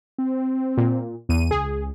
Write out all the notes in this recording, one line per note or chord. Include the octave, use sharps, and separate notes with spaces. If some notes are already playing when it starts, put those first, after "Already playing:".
C4
A#2
E2 D#7
C#2 G#4